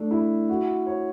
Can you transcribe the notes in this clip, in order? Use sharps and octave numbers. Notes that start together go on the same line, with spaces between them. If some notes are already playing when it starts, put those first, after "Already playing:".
Already playing: A3 D4
E4
F#4
C#5